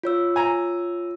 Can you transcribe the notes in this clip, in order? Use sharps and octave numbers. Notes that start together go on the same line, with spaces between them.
F4 C#5 E6
G#5 A#5